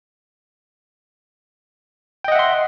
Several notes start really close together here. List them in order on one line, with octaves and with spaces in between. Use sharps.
G5 D#5 F#5 E5 C6